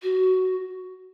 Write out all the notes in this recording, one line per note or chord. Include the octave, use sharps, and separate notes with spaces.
F#4